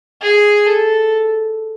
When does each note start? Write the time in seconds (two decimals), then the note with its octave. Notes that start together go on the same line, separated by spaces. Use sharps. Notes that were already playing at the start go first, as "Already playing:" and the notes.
0.22 G#4
0.66 A4